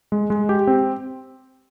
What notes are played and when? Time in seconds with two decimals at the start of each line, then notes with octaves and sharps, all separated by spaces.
0.12 G#3
0.30 G#3
0.49 G4
0.67 C4